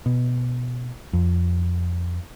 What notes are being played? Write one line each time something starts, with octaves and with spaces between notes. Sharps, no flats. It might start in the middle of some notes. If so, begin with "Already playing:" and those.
B2
F2